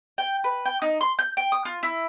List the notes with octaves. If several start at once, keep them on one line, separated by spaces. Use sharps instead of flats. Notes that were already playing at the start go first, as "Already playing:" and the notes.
G5
B4
G5
D#4
C6
G6
G5
D#6
F4
E4